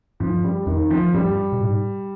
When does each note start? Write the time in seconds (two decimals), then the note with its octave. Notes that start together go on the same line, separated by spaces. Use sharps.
0.20 G2 F3
0.44 G3
0.67 F2 D#3
0.90 F3
1.14 G2 G3
1.53 B2
1.60 G#2